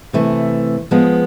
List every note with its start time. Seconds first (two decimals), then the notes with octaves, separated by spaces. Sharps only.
0.13 C3 E3 A3
0.91 F3 G#3 B3